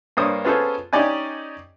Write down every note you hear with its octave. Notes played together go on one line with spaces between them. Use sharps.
G2 A#3 D4 C5 C#5 D#6
B3 C#4 F4 G#4 A4 C5
C#4 D#4 G4 D5 D#5 G#5